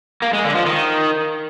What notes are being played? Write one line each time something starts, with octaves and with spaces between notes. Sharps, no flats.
A#3
G#3
D3
F3
D#3